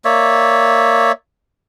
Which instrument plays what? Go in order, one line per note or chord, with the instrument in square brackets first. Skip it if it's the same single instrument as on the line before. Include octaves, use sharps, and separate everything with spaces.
[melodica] A#3 C#5 D5 E5